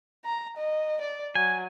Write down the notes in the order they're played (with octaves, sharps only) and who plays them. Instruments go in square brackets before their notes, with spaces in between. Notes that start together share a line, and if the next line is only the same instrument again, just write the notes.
[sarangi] A#5
D#5
D5
[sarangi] F#3 [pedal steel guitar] G#5